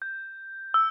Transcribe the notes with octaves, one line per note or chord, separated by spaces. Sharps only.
G6
E6